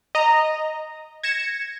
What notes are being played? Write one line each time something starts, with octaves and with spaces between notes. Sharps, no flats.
D#5 A#5
G#6 A#6 C#7 E7